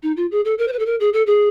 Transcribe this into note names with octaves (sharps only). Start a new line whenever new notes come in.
D#4
F4
G#4
A4
A#4
C5
B4
A4
A#4
G#4
A4
G#4